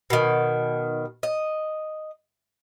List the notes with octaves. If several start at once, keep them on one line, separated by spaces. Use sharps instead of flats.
B2 D#3
D#5